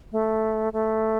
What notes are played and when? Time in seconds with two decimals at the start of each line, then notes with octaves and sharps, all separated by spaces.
0.12 A3
0.73 A3